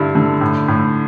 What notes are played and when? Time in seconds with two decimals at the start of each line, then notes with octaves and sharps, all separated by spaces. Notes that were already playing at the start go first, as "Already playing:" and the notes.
Already playing: G2 D3 E4
0.15 D3
0.41 A2
0.68 A2